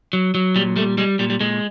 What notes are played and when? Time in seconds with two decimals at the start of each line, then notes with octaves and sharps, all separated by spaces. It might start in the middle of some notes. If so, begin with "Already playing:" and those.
0.13 F#3
0.35 F#3
0.56 A#2 G3
0.76 G3 A3
0.98 G3 G#3
1.19 A#2 G3
1.30 G3
1.40 A#2 G#3